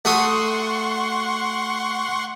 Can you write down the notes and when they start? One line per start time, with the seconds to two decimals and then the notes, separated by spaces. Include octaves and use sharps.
0.05 A3 F#4 F#5 C6 C#6 D#6